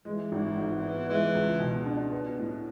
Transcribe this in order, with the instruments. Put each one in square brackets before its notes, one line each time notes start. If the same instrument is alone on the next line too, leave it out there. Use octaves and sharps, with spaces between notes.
[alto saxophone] E3 [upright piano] G#3
[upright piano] G#1
G#2
B3
[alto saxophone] E3 [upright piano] G#3
[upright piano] C#2
B2
D4
B3
A2